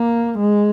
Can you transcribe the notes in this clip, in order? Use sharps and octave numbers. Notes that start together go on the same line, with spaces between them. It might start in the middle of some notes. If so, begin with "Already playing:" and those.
Already playing: A#3
G#3